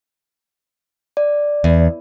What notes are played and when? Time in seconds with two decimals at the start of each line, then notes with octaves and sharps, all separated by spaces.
1.17 D5
1.64 E2